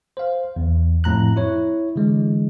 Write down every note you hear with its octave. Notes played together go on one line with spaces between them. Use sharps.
C5 F5
E2
F2 A2 A#5 F#6
E4 C#5
D3 E3 G#3